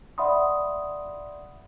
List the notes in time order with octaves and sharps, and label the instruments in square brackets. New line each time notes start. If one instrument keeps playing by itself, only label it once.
[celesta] D5 E5 F#5 B5 C6 D#6